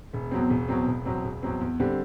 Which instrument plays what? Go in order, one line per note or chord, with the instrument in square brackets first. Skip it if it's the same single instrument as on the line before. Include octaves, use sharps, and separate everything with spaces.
[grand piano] E1
E2 B2 F#3 C4
E1
E2 B2 F#3 C4
E1
E2 B2 F#3 C4
E1
E2 B2 F#3 C4
E2
D3 G3 C4